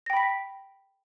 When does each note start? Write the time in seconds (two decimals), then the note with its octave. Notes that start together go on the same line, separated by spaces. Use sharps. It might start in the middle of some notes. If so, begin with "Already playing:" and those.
0.06 A#6
0.10 G5
0.13 B5
0.17 B6